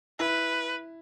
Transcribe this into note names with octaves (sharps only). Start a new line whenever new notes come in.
E4 B4